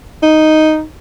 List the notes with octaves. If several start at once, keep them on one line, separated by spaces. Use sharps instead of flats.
D#4